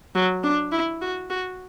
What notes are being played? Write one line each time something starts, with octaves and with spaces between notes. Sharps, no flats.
F#3
D4
E4
F#4
F#4